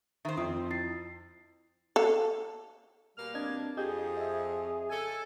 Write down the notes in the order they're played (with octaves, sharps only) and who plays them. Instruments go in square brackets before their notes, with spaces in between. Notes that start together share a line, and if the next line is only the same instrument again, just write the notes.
[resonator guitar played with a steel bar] D#3 C5 [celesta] E5
[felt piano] F2 [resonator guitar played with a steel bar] C4 [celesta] D#6
[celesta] E4 A6 C7
[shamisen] A4 F5
[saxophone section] B2 G3 A#3 [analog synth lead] F6
[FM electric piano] C4 D#5 G#6 [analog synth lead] D4
[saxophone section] F2 [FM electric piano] G4 D#5 G6 [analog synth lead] G#4
[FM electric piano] D#5 E5
[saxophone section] C#3 A4 [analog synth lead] G#5